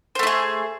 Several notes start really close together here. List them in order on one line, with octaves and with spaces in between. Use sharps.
C5 A3 E4 G#4